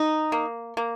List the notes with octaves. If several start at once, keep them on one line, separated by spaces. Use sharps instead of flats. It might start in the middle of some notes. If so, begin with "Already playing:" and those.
Already playing: D#4
A#3
A#3